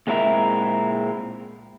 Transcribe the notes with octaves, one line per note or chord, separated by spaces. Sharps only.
A#2 G#3 C4 E4 A#4 E5